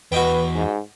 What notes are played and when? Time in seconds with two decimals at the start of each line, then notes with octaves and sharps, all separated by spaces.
0.12 E2 F#4 B4 D#5 G5
0.55 G#2